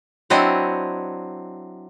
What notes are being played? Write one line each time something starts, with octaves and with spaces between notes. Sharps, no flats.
F#3 C4 D4 E4 D#5